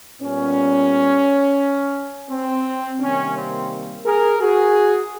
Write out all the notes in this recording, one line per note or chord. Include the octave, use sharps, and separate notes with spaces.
A#2 G3 B3 C#4
C4
C3 D#3 G3 A#3 C#4
C4
G#4 A#4
F#4 G#4